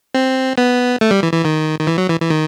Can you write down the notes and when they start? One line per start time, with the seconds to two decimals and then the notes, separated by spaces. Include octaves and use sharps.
0.15 C4
0.58 B3
1.01 A3
1.11 G3
1.23 E3
1.33 E3
1.45 D#3
1.80 D#3
1.87 E3
1.98 F#3
2.09 E3
2.20 E3
2.30 D#3